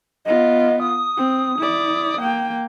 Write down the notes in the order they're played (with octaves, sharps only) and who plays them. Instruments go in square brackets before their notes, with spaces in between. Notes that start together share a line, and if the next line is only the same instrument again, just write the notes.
[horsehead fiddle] B3 F4 [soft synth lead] D#5
[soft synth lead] D#6
[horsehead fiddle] C4
E4 D5
A#3 G5